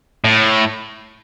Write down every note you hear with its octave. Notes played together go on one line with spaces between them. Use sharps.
A2